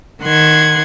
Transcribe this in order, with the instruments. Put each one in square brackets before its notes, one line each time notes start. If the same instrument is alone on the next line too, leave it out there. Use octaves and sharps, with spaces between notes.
[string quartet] D#3 F#5 C6 G#6